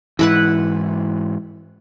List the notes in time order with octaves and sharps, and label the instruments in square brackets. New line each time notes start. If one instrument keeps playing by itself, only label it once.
[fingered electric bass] G#2 E3 [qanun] E4 B4 F#5